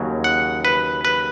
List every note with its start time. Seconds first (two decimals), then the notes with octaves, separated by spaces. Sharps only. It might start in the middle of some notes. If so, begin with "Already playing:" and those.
Already playing: D#2 C#3 F#3
0.24 F#5
0.65 B4
1.05 B4